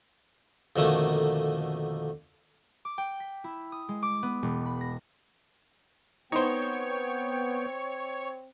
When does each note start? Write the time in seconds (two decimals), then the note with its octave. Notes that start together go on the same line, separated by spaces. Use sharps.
0.76 F2 B2 D3 D#3 A3 A#3
2.85 D6
2.98 G5
3.20 B6
3.44 E4
3.72 D#6
3.89 G#3
4.03 D6
4.23 B3
4.42 E1
4.66 B5
4.81 A#6
6.32 B3 C4 D#4 C5 C#5 G5